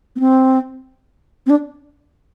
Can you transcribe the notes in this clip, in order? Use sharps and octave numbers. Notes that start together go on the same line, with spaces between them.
B3
C4
C4
D4